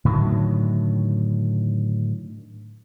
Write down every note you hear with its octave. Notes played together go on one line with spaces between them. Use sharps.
A2 D3 D#3 F#3